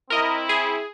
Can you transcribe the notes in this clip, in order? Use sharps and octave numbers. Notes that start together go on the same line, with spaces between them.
C4 E4 A#4 D#5
G#4